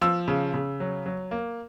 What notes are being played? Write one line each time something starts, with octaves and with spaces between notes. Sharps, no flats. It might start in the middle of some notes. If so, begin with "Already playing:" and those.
F3 E6
C#3
C#3
F#3
F#3
A#3